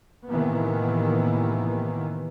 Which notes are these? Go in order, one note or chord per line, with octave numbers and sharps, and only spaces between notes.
A2 C3 D#3 E3 A#3 B3